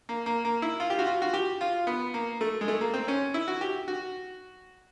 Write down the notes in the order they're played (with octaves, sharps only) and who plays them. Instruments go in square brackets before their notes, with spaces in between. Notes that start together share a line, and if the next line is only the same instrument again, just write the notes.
[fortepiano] A#3
A#3
A#3
E4
F4
G4
F#4
F4
F#4
G4
F4
B3
A#3
A3
G#3
A3
A#3
C4
C#4
E4
F#4
G4
F#4